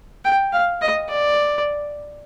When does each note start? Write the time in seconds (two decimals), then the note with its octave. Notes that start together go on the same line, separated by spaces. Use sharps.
0.25 G5
0.52 F5
0.81 D#5
1.09 D5